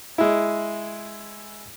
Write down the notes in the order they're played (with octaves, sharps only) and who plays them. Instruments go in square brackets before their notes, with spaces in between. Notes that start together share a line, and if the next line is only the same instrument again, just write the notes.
[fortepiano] G#3 E4